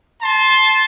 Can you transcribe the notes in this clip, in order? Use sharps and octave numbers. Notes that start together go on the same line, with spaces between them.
A5 C6